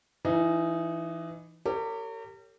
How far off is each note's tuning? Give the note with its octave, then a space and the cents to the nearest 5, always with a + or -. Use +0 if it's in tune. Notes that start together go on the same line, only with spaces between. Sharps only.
E3 +20 D#4 -5
G4 +0 A#4 -40 C#5 +15